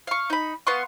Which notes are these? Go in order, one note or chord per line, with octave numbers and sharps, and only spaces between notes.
F5 C#6
D#4 B5
B3 F5 C6 C#6